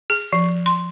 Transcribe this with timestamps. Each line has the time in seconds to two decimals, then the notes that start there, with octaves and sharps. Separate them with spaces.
0.10 G#4
0.33 F3
0.66 C6